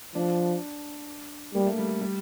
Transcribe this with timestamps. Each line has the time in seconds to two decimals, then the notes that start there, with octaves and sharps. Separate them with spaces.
0.15 F3 D4
1.54 G3 A#3
1.66 A3
1.78 G3
1.89 A3
2.01 G3